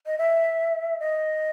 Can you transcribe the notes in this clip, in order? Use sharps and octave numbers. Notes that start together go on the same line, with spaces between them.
D#5
E5
D#5